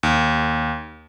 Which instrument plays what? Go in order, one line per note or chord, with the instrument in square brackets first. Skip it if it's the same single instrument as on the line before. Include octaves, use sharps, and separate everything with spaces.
[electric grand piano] D#2